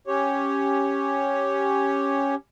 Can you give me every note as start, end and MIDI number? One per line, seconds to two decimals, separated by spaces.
0.07 2.35 61
0.07 2.35 67
0.07 2.35 73